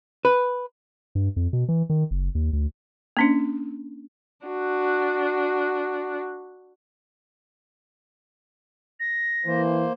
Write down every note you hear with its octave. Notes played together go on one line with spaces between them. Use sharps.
B4
G2
F2
B2
E3
D#3
F#1
D#2
D2
A#3 C#4 D4
D4 F#4
A#6
E3 A#3 C5